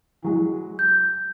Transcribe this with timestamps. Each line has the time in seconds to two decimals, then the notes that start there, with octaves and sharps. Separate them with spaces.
0.22 E3 F#3 G#3
0.79 G6